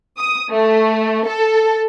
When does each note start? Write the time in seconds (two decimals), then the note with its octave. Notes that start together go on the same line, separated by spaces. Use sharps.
0.18 D#6
0.51 A3
1.27 A4